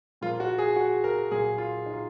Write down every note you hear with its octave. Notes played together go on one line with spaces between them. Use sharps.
A#2 F3 A#3 F4
F#4
G#4
F#4
A#4
A#2 F#3 A#3 G#4
F4
D#4
F4